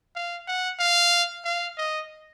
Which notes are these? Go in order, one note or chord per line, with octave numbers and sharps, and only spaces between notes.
F5
F#5
F5
F5
D#5